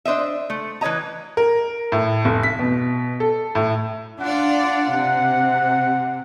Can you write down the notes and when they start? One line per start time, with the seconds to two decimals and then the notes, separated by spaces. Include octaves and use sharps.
0.05 D4 C5 D#5 E5
0.50 A3
0.81 E3 B4 C#5 D#5 A#5
1.37 A#4
1.92 A2
2.25 F1
2.43 B6
2.59 B2
3.20 A4
3.55 A2
4.21 D4 F4 D5 F#5
4.92 C3